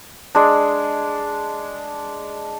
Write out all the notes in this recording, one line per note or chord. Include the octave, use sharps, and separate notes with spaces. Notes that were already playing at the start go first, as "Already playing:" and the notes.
G#3 D4